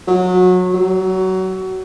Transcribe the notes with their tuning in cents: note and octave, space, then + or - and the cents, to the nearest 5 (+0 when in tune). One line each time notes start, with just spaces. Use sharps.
F#3 -25
F#3 +25